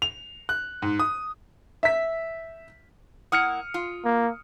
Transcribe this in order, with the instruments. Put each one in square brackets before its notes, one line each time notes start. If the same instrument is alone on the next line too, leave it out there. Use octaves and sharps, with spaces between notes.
[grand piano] F7
F#6
G#2
D#6
[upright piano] E5 B6
[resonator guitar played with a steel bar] A#3 E4 F#5 [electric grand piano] D#6 F6 C#7
[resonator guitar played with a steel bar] F4
[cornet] A#3